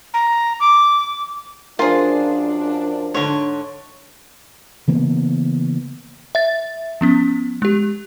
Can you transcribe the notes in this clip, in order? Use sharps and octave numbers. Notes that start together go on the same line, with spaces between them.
A#5
D6
F#2 F3 D4 F4 G#4 A#4 C5
G#2 D3 C#5
C#3 E3 A#3 B3
E5 A6
F3 B3 C#4
G#3 G4